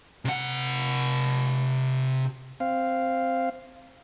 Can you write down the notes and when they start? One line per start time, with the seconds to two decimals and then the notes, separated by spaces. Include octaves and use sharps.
0.25 C3 F#5
2.60 C4 F5